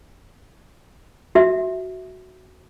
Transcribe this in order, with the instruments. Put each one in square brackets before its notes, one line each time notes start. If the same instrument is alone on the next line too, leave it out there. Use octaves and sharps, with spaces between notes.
[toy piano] F#4 E5